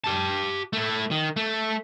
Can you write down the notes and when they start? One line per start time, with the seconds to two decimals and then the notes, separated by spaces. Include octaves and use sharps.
0.04 G4 A5
0.73 A3 E4
1.11 D#3
1.37 A3